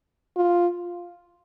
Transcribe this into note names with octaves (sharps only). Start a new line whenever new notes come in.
F4